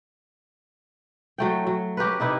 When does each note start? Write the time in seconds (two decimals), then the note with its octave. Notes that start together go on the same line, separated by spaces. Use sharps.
1.38 F#3 A3 G5
1.67 F#3
1.97 C#4 G4 A#4 B4
2.20 C3 D#4 E4 B4